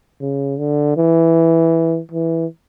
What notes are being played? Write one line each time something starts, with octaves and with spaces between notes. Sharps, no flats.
C#3
D3
E3
E3